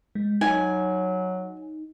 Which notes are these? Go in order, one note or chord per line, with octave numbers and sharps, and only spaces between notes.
G#3
F#3 D#4 G#5